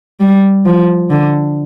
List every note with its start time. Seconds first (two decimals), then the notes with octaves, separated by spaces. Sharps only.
0.21 G3
0.65 F3
1.10 D3